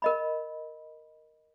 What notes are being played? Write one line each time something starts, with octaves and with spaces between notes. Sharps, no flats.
A#4 D#5 B5